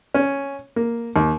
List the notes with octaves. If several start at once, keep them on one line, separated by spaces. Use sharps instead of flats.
C#4
A#3
D#2